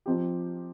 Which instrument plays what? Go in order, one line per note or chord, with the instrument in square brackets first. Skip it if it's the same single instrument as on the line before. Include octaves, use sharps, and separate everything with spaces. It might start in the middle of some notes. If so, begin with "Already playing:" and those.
[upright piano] F3 C4 D#4 G4